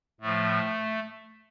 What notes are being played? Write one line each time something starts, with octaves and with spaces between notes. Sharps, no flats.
A2 F3 A3